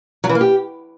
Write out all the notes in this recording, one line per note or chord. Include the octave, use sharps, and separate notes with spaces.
F#3
E3
A#3
G4